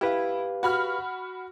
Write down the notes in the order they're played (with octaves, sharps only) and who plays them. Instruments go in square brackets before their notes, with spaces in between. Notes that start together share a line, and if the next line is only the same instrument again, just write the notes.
[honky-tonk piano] E4 [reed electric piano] G4 B4 F5
[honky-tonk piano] F#4 B5 F6